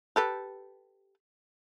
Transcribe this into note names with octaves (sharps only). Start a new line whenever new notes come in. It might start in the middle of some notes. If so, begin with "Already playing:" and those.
G4 A4 B4